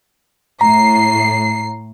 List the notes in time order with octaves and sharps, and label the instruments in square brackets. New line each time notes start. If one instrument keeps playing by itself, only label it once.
[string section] A2 C7 [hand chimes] A#5